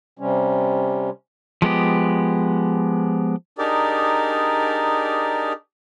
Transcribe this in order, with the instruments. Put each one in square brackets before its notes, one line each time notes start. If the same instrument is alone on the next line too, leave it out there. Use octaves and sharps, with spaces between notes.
[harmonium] C3 G3 C#4
[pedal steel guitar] F3 G#3 B3 G4
[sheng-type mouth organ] D4 D#4 G4 G#4 A#4 D5